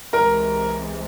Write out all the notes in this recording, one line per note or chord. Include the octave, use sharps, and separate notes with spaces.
C2 C3 E3 G#3 A#4 A#5